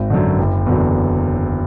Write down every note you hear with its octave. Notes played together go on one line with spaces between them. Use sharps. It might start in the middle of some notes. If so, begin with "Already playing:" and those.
Already playing: G#1
F#2 D3
F#1
E2 D3 F#3